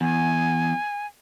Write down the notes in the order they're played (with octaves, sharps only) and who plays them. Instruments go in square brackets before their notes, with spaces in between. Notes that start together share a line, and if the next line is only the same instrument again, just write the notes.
[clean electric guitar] E2 [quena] G#5